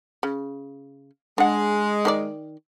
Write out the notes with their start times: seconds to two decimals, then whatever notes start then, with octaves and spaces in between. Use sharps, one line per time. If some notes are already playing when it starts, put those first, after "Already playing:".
0.23 C#3
1.38 G#3 D4 F#5
2.05 D#3 D4 D5